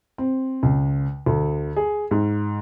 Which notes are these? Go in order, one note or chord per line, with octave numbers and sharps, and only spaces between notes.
C4
C#2
D2
G#4
G#2